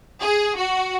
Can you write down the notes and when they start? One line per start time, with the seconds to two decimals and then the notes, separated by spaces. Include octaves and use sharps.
0.21 G#4
0.56 F#4